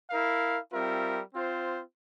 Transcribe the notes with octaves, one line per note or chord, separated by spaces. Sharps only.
E4 A#4 F5
G3 C4 F4 A#4 E5
C4 F4 C5